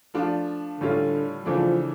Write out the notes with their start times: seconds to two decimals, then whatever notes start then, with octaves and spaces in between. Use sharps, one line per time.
0.14 F3 A3 D4 F4
0.80 A2 D3 G3 C#4 F4
1.46 C#3 E3 F3 A3 D4